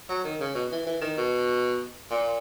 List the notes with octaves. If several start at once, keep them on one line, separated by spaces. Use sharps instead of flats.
F#3
D#3
C#3
B2
E3
E3
D#3
B2
A#2